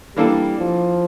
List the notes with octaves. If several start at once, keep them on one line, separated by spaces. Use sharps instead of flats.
E3 G3 A#3 D4 A4
F3